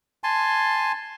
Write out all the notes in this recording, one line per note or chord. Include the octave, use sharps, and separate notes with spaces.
G#5 A5 C6